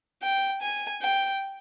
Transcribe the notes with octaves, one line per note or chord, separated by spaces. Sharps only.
G5
G#5
G5